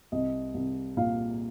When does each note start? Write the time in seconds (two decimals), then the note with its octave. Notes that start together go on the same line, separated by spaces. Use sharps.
0.12 C2 D#5
0.54 C2
0.97 A#2 F5